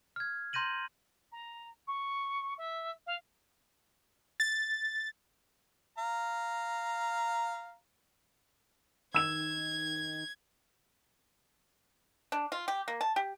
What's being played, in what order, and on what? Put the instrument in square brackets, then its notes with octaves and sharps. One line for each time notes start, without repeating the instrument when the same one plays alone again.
[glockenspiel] F6 G#6
A#5 C6 G6 A#6 D#7 F#7
[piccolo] A#5
C#6
E5
F5
[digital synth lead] A6
[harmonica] F5 A#5
[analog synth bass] D#3 [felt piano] E6 E7 [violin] G#6
[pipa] D4
F4
G4
A#3
A5
G4